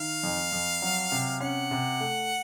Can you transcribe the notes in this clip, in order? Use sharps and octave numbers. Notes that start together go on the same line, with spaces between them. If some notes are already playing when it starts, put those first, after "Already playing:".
Already playing: D#3 F5
F2
F2
F#3
C3
C#4 F#5
C3
A3